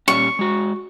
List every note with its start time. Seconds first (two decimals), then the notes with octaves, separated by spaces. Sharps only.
0.08 A#2 G3 C#4 C#6
0.39 G#3 F#4